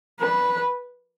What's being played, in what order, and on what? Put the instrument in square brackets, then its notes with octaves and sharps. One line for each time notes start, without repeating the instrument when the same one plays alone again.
[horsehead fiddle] B4